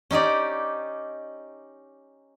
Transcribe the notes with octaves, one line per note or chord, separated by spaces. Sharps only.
C#4 D#4 G4 D5